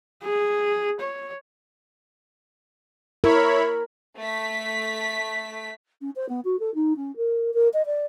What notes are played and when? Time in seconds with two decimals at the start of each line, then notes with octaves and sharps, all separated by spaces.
0.23 G#4
1.00 C#5
3.24 E4 A#4 C#5 B5
4.17 A3 B6
6.01 C#4
6.16 C5
6.29 B3
6.44 F#4
6.59 A4
6.74 D#4
6.96 C#4
7.16 A#4
7.53 A#4
7.73 D#5
7.85 D5